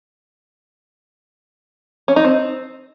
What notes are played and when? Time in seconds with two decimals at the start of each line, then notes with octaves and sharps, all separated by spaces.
2.08 C#4
2.16 D#4
2.25 C4